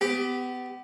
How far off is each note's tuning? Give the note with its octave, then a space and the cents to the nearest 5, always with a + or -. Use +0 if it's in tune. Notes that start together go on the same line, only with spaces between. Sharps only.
B3 +30 G4 +0